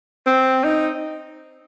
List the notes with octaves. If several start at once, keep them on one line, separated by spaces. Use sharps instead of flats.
C4
D#4